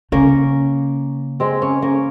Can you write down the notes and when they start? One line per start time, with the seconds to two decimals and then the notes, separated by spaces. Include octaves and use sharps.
0.12 C#3 A#3 C#4
1.40 G#3 C4
1.62 A#3 C#4
1.82 A#3 C#4